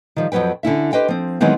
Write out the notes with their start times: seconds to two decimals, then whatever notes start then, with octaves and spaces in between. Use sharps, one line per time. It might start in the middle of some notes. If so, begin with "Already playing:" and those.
0.16 D#3 F3 G3
0.32 F2 F3 F#3 B4 G5
0.63 D3 C#4 E4 E5
0.93 G4 B4 C5 D#5 G5
1.08 F3 C4
1.41 D#3 E3 F#3 G#3 B3 C4